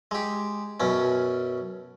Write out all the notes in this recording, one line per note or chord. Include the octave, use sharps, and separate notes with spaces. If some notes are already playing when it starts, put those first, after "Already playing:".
G#3 G4
F#2 B2 C#4